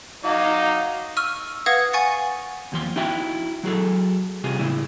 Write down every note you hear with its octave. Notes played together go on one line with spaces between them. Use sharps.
F#3 D#4 D#5 F5 D6
C#6 E6 F6 D#7
B4 F5 F#5 D#6 G#6 A#6
F#5 G#5 C#6 A6 C#7
D#2 F3 C6
D#4 E4 F#4 E5 G5
F#3 F#4 G#4 A4
C3 G3 F4 G#4
A2 C#3 E4